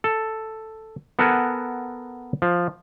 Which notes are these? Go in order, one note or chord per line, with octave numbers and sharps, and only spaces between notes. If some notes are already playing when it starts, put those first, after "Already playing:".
A4
B3 A4 A#4 F#5 G#5
F3